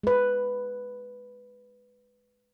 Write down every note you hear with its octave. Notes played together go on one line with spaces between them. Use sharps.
G#3 B4